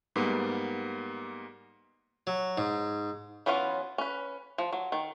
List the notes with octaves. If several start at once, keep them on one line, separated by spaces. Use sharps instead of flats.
G#2 G3 A#3 B3
F#3
G#2
E3 F#3 B3 C#4 F4
C#4 B4
F3
F#3
D#3